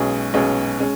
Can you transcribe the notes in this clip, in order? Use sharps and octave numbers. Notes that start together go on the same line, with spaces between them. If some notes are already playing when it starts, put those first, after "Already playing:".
Already playing: B1 B2 G#3 C#4 G#4
B1 B2 G#3 C#4 G#4
G#3 C#4